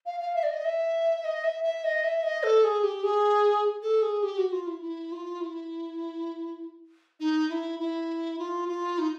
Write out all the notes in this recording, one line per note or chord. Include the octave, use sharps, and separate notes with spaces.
F5
F5
E5
D5
D#5
E5
D#5
E5
E5
D#5
E5
D#5
A4
G#4
G4
G#4
A4
G#4
G4
F#4
F4
E4
E4
F4
E4
D#4
E4
E4
F4
F4
D#4